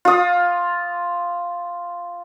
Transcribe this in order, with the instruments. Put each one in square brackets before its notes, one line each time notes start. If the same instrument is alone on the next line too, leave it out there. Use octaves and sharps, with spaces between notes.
[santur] F4 D#6